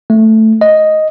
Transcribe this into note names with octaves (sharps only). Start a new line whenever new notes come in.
A3
D#5